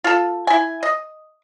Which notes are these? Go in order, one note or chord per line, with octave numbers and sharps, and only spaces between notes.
F4 A4
E4 G#5
D#5